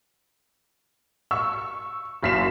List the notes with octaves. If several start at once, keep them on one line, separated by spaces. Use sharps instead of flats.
C#6 E6
F#1 F#2 B6 C7 E7